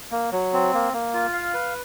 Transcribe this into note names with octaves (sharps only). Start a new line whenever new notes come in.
A#3
F#3
C4
A#3
A#3
F4
F5
B4